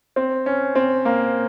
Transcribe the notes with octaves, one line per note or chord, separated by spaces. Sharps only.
C4
C#4
C4
A#3